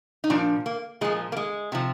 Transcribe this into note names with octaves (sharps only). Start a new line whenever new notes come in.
D#4
A#2 F3 D4
A#3
A#2 F3 G#3
A#3
G#3
C3 F3